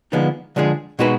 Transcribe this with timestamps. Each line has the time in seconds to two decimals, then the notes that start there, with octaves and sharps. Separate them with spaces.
0.12 D3 F3 G#3 B3 D#4
0.56 D3 F3 G#3 D4 G#4
0.99 B2 G#3 D#4 F#4 B4